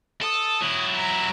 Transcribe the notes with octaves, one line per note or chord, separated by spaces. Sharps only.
A4 D#6
F#3 E4
A#5